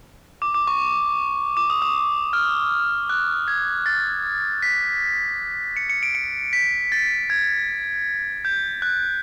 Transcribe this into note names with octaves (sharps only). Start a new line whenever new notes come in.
D6
D6
C#6
D6
D#6
D#6
F6
F#6
G#6
A6
B6
C#7
C#7
D7
C#7
B6
A6
G#6
G6
F#6